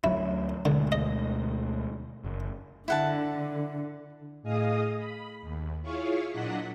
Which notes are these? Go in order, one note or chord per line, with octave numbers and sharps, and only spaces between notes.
D2 F#3 C#4 E4
D2 B2 D3 G#3
D#5
F#1
D3 E4 F#5 A5
A2 G#4 D#5 F5 D#6
B5
D#2
E4 F4 G#4 C#5 F5 C#6
A#2 F#3 D4 D#5 F#5 B6